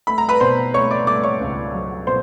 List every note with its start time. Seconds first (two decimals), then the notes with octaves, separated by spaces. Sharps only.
0.07 A3 B5
0.18 A#5
0.29 B4 B5
0.40 B2 C5 C6
0.74 A3 C#5 C#6
0.91 D5 D6
1.07 A3 D5 D6
1.23 C#5 C#6
1.40 C#2
1.74 F#3
2.06 B2 C5 C6